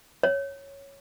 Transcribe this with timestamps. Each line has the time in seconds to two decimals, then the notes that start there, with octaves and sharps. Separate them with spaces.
0.23 C#5